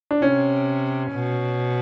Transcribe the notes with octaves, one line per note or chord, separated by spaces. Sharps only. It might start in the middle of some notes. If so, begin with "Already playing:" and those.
D4
C3 C#4
B2